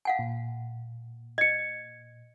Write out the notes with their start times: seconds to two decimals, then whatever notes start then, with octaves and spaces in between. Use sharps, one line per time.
0.05 F5 F#5 G#5
0.19 A#2
1.38 D#5 G#6 C#7